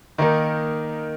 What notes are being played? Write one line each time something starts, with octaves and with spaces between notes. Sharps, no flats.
D#3 A#3 D#4 A#4